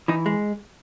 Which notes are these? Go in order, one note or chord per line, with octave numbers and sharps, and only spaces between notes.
E3 D#4
G#3